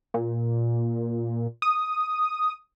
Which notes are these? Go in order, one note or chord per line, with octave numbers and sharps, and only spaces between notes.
A#2
D#6